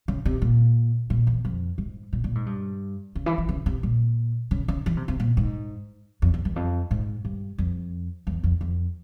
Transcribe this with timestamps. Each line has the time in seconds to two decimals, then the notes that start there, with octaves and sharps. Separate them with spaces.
0.08 C#3
0.25 C3
0.42 A#2
1.10 A#2
1.27 E2
1.45 F2
1.78 G#2
2.13 A#2
2.24 A#2
2.35 G#2
2.46 G2
3.15 C#3
3.26 E3
3.38 E3
3.49 C#3
3.66 C3
3.83 A#2
4.51 C#3
4.68 C#3
4.86 E3
4.97 C3
5.08 C3
5.20 A#2
5.37 G#2
6.22 F2
6.34 E2
6.45 E2
6.56 F2
6.91 G#2
7.25 G2
7.58 F2
8.27 E2
8.43 F2
8.61 F2